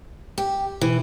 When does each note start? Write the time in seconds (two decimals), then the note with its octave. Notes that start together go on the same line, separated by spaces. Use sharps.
0.38 G4
0.81 B2 E3